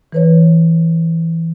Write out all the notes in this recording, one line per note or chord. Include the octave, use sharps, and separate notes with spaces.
E3 B4 C#5